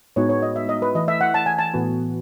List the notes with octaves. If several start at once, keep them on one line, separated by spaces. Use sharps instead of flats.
A2 G#3 B3 D#4 F#4 C#5
C#5
D#5
E5
D#5
B4
E3 A3 E4 D#5
E5
F#5
A5
G#5
A5
A2 E3 B3 F#4